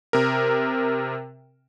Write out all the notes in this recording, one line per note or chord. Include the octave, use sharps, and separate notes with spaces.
C3 A#4